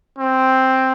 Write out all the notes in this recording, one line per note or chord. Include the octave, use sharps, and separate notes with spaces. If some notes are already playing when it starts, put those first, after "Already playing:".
C4